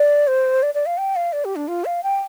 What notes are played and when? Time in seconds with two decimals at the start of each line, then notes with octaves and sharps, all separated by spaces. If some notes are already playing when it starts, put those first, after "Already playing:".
Already playing: D5
0.27 C5
0.63 D5
0.74 D5
0.86 F5
0.98 G5
1.16 F5
1.33 D5
1.45 G4
1.56 D4
1.68 F4
1.85 F5
2.03 G5